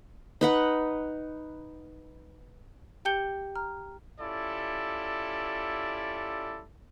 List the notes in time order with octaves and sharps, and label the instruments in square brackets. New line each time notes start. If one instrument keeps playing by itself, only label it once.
[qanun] D#4 B4 F#5
[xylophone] G4 G5 A5 G6 C#7 G7
A#5 F6
[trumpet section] C#4 E4 F4 G4 A4 D5